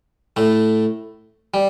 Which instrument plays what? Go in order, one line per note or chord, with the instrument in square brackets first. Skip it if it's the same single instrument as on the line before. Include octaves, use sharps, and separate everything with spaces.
[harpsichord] A2 A3
G3